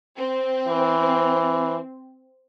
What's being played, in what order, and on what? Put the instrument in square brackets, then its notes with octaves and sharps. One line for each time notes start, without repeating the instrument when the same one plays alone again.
[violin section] C4
[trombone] E3